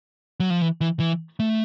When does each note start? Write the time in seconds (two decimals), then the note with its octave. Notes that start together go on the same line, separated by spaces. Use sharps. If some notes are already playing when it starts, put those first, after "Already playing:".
0.40 F#3
0.50 F3
0.61 E3
0.81 E3
1.00 E3
1.40 A3